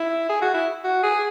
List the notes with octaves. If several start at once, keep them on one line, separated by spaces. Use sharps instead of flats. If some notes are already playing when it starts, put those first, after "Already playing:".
Already playing: E4
G#4
F#4
E4
F#4
G#4